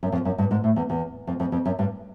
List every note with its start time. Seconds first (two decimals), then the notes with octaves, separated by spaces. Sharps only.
0.03 F#2
0.12 F2
0.25 F#2
0.38 G2
0.51 G#2
0.64 A2
0.76 E2
0.90 E2
1.27 F2
1.40 F2
1.52 F2
1.65 F#2
1.79 G2